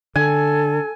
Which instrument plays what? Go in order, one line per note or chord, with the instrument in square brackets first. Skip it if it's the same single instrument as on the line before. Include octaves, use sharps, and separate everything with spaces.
[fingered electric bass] D3 [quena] A4 [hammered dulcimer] G#5